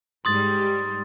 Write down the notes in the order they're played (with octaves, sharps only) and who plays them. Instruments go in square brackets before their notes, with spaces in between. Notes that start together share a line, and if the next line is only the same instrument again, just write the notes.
[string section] G#2 G3 [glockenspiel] C6 D#6 A6